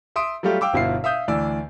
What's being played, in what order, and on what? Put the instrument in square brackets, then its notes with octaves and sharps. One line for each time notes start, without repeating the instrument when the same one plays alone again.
[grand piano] E5 C6 D#6 D7
F#3 G3 A3 F4 G4
F5 G5 D6 E6
G1 B2 E4 F4 C7
E5 F5 D#6 G6
D2 E3 D5 E6